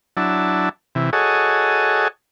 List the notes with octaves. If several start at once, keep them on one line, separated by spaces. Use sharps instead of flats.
F#3 D4 E4 A5
C3 E3
F#4 G#4 A4 C#5 D#5